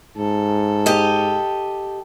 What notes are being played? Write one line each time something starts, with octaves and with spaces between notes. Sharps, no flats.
G#2 A4
G4 D#5